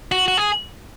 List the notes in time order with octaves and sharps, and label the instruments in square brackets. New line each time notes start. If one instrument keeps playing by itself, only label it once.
[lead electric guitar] F#4
F#4
G#4